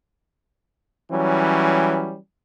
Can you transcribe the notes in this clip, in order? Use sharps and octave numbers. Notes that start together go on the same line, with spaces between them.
E3 F#3 G3 C#4